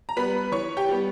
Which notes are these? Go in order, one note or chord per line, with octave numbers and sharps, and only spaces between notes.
A#5
G3 B3 B4 B5
E3 C#5 C#6
G4 G5
G3 B3